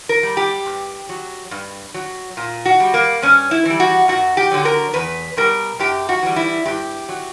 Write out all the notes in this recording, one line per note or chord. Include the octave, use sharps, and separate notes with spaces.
A#4
G3
G4
G2
F#3
G2
F#3
A#2
F#4
G3
A#3
G2 C#4
E4
E3 G3
F#4
F#2 F#4
G4
D3 F#3
A#4
E2 B4
B2 G3 A#4
F#2 G4
F#4
E3 G3
E4
G2 G4
F#3